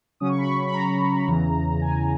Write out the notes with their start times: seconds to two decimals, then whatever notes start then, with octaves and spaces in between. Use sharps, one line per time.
0.20 C#3 F#3 C#4 D#6
0.29 C#6
0.39 B5
0.47 C#6
0.67 B5
0.74 A#5
1.27 E2 C#3 E3
1.82 G#5